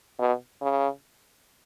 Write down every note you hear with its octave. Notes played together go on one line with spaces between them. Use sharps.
B2
C#3